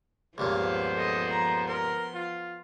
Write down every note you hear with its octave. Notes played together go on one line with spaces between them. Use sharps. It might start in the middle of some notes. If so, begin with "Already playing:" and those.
C#2 G2 A#2 F3 B3 C5 F5
A4 D#5
A#5
A#4 C6
F4